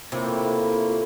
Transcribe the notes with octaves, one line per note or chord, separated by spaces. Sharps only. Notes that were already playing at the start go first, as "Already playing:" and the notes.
A2 C3 A#3 E4 F4